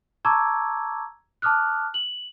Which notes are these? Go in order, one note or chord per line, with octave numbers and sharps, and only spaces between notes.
A5 A#5 C#6 D6 E6 G#6
A5 D6 D#6 F6 F#6
F#7